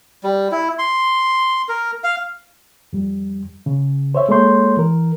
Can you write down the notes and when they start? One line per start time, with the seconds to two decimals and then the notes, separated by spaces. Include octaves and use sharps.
0.23 G3
0.51 E4
0.79 C6
1.69 A#4
2.04 F5
2.93 F2 G3
3.66 C#3
4.15 C5 C#5 E5
4.29 G#3 A#3 A4 C#5 C6 G6
4.77 E3 A#4